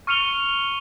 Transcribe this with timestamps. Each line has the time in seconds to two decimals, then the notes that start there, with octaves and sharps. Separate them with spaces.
0.07 C#6 F6 C#7 D#7 F7 G7